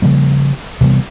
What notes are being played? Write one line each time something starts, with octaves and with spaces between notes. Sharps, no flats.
C#3 F3 G3 A#3
C3 E3 G3 B3